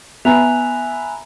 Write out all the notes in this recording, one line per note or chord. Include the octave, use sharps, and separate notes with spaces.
B3 E5 G#5 A#5 B5 F#6 F7